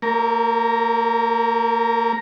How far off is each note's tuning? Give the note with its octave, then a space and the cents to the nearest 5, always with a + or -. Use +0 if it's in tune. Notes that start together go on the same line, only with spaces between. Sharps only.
A#3 -35 A#4 +10